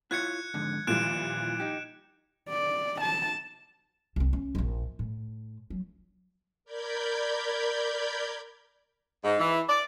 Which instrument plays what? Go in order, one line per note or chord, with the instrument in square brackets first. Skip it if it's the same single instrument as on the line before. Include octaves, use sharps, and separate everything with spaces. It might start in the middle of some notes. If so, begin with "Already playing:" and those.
[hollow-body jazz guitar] E4 F4 C#5 [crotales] F#6 G#6 C#7
[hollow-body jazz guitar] F2 G#2 D3
[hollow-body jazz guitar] D#2 F3 [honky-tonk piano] A#2 E3 G3 [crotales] F#6 D7 E7
[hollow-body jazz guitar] D#4 G4
[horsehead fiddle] D5
A5
[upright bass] C2 C4
C#4
E1 A#1
A2
F#3
[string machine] A#4 D5 B5 G6 G#6
[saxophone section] G#2
E3
D5